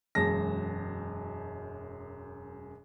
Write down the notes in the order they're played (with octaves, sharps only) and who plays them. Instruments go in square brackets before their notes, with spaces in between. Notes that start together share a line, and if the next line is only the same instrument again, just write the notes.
[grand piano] E1 F#2 G#3 A5 A#6